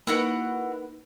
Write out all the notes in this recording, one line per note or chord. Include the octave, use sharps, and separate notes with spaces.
A#3 D#4 E4 F#4 B4 F#5